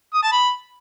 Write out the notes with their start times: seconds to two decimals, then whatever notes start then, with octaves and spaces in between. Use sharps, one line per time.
0.14 D#6
0.23 A5
0.32 B5